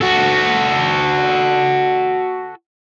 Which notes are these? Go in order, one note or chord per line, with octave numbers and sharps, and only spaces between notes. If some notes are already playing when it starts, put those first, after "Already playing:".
F#4 A4